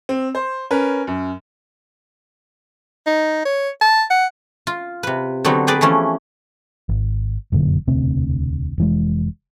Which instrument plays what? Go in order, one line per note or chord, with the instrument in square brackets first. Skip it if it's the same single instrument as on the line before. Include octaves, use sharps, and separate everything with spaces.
[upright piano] C4
C5
C#4 A#4 B4
F#2
[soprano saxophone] D#4
C#5
A5
F#5
[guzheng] F4
C3 B4
D3 F#3 B3 C4 D#4
G4 G#4 B4 D5
E3 F3 A3 C#4
[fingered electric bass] G#1
F1 F#2 A#2 D3
E1 D2 C3 C4
F1 E3 G#3